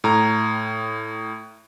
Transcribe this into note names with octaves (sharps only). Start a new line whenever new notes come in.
A2 A#5